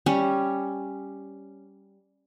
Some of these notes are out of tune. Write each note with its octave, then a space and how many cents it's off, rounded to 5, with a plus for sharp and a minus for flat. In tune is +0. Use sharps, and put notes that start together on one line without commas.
G3 +0 C#4 +0